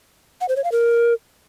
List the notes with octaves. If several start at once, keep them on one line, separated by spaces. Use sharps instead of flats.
F#5
C5
C#5
F5
A#4